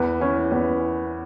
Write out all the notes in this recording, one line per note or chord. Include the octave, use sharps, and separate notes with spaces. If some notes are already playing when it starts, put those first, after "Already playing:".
Already playing: E2 B4
E3 C#4
E2